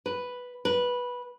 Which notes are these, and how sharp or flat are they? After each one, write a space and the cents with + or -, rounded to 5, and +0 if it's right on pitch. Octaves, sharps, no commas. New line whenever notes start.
B4 +0
B4 -10